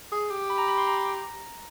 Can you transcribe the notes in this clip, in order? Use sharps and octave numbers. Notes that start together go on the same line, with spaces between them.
G#4
G4
B5
A#5
B5
C6
A#5